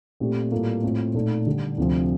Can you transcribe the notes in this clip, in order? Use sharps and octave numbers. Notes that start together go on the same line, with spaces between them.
A#2 A3 C4 G4
A2 G3 A#3 F4 A4
A2 A3 C4 F4
A#2 A3 D#4 A4
D3 G3 D4 G4
D2 C3 F3 C4